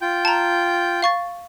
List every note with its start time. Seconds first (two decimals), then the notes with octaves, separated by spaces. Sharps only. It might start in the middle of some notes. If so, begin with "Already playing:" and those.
0.01 F4 G5 G6
0.25 A5 A#5
1.02 F5 C#6 A6